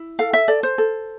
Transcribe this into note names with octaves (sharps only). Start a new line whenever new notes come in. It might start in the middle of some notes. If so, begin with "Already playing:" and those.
Already playing: E4
A4 F5
E5
A4 D5
C5
A4